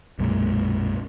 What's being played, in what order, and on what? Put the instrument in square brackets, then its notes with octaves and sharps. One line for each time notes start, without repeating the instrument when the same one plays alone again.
[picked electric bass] B1 F#2 A#2 G#3